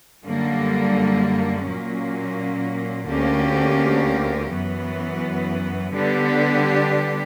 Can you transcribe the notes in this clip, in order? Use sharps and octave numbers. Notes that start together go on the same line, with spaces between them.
F#2 D3 G3 A#3
A#2 F#3 A#3 C#4
D2 D3 A#3 C#4 G4
F#2 E3 B3
D3 G3 B3 D4 G4